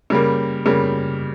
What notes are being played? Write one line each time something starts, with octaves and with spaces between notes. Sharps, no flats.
C#3 G3 A#3
C#3 G3 A#3